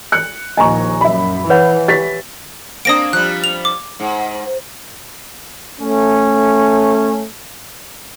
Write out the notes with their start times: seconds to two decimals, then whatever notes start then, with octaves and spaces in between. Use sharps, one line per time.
0.12 F#6 C#7
0.57 A#1 D#2 D#5 G#5 A#5 C#6
1.01 F#2 E5 B5
1.50 E3 B4 C#5 F#5
1.88 G4 A6 B6
2.85 A#3 C4 D4 D#6 A#6 D7
3.13 F3 G3 F#6
3.44 F7
3.65 D6
4.00 G#2
5.80 A3 C#4